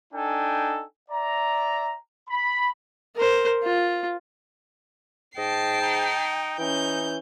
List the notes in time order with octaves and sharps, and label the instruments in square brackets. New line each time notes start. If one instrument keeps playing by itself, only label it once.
[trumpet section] D4 D#4 A4 G5 G#5
D5 E5 A#5
B5
[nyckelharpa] A#4 C5
F4
[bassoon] G#2 [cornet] D#5 [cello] G5 [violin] A5 C7
[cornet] D#4
[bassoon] E3 [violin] C#4 G6 [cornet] D#4